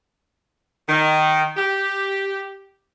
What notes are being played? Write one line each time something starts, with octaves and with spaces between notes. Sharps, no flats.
D#3
G4